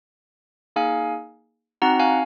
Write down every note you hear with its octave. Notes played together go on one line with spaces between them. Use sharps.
A#3 D#4 G#4 F5 G#5
C4 D#4 F#4 F#5 A#5
F5 G#5